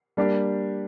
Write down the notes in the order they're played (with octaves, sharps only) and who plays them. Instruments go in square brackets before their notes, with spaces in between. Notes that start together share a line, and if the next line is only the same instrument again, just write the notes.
[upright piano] G3 A#3 D4 G4